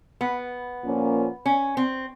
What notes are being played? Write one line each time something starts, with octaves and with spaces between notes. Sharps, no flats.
B3
A#2 F3 A#3 C#4
C#4
C4